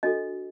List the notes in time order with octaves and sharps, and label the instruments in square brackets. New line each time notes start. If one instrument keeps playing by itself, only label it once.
[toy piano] D4 F#4 A4 D#5